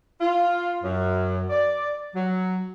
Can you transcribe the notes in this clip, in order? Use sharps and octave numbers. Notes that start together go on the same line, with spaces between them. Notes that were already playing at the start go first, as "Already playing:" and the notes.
F4
F#2
D5
F#3